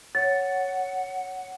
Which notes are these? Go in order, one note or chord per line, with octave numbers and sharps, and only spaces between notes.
C#5 F#5 A6